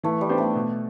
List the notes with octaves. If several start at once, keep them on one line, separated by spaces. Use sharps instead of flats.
E3 A3
G3
B3 D4 G4 C5
A3
B2